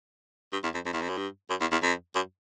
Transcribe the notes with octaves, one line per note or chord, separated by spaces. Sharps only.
G2
E2
F2
F2
E2
F2
F#2
G2
F#2
E2
E2
F2
F#2